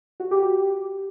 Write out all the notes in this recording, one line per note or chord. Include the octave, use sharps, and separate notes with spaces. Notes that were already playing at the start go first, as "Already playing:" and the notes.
F#4
G4
G4